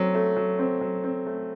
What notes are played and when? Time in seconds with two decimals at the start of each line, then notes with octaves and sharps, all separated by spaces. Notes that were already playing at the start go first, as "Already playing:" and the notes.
Already playing: F#3 A3 C4
0.15 A3
0.36 F#3
0.59 C4
0.81 F#3
1.04 C4
1.26 A3